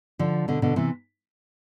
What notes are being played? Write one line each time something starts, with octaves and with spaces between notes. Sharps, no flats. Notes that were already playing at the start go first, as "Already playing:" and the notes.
D3 F3
B2 D3
B2 D3
C3 E3